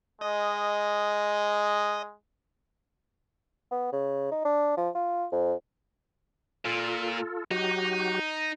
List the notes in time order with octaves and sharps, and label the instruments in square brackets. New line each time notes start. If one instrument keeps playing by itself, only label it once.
[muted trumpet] G#3 [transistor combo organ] D#5
[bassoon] B3
C#3
D#4
D4
F3
F4
F2
[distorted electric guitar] A#2 [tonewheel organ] F4 A4
[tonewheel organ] F#3 F#4 G4 [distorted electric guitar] D#4